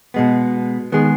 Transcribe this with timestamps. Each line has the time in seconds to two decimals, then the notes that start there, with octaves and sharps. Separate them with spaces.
0.14 B2 G#3 B3
0.92 D#3 G#3 B3 G#4